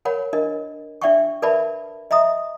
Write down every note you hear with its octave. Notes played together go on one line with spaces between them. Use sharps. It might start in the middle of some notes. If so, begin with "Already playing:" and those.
A#4 C#5 F#5 B5
D4 A#4 D#5
D4 D5 E5 F#5 G5 C#6
A#4 B4 D5 E5 A5 B5
D#5 E5 A#5 D#6